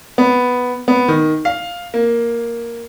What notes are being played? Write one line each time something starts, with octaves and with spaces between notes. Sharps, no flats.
B3
B3
D#3
F5
A#3